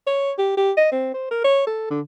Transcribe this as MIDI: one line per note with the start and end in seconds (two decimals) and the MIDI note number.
0.07 0.32 73
0.38 0.53 67
0.57 0.72 67
0.77 0.91 75
0.92 1.10 60
1.14 1.29 72
1.31 1.44 70
1.44 1.66 73
1.67 1.86 69
1.90 2.01 50